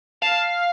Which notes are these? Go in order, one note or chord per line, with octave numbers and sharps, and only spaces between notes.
F5 A5